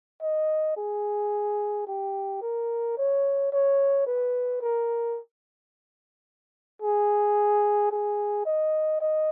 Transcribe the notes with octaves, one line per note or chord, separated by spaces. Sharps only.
D#5
G#4
G4
A#4
C#5
C#5
B4
A#4
G#4
G#4
D#5
D#5